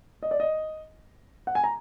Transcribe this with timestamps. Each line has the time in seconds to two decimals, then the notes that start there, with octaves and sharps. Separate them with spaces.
0.23 D#5
0.31 D5
0.40 D#5
1.47 F#5
1.55 G#5
1.64 A#5